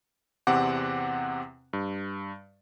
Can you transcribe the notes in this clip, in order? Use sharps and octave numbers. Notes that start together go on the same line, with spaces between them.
E2 C3 C4 F#5 D6
G2